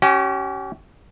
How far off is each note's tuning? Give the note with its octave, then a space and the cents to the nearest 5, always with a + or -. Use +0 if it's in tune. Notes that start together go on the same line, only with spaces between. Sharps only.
C#4 +0 G4 -40